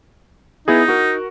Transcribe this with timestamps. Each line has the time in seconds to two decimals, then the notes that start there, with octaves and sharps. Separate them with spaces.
0.68 B3 D#4 E4 G#4
0.88 F#4 A#4